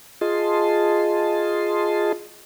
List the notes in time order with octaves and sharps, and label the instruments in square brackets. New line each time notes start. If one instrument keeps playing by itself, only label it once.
[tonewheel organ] F4 G#4 D#5 A5 C6